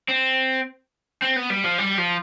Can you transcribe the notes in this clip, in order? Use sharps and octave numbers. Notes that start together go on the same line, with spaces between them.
C4
C4
B3
G3
F3
G3
F3